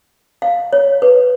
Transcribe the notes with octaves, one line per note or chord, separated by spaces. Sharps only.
F5
C#5
B4